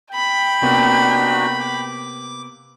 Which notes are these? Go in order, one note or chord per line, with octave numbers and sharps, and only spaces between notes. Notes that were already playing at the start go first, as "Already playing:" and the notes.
G5 B5
C3 A#3 B3 D4 D#4 F#4
D6